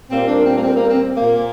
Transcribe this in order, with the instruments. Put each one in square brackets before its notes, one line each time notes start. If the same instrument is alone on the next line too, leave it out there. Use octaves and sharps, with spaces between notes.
[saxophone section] A#2 G3 A#3 C4
A#3 D4
C4
A#3
C4
A#3
C4
A#2 A#3